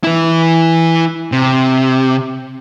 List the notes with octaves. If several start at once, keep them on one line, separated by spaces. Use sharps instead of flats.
E3 E4
C3